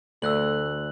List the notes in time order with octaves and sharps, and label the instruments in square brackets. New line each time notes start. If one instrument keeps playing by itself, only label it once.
[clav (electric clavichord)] D2 [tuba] A3 [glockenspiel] E6 F#6 F#7